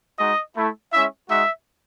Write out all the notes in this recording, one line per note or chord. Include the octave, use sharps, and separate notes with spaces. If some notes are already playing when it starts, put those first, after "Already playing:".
G#3 D#4 F#4 D#5
A3 E4
G#3 C#4 E4 E5
G#3 D#4 F#4 E5